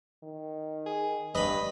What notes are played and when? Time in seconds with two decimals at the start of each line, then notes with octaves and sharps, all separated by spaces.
0.23 D#3
0.86 G#4
1.35 G2 B4 D#5 B5